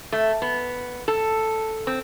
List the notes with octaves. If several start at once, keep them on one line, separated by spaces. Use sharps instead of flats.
A3
B3
A4
C4